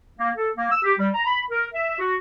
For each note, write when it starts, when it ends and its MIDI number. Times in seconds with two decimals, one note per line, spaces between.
0.18 0.29 58
0.37 0.49 69
0.55 0.69 58
0.71 0.79 88
0.83 0.93 67
0.98 1.08 55
1.13 1.24 82
1.27 1.41 83
1.51 1.66 70
1.73 1.97 76
1.99 2.15 66